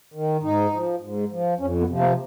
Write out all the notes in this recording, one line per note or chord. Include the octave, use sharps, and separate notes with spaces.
D#3
G#2 D#4
F3
G#2
F3
F2 C#4
B3
C3 F3
A#3